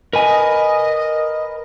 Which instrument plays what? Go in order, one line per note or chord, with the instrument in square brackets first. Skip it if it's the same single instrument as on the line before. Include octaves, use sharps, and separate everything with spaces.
[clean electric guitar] A#4 B4 G#5 [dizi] D#5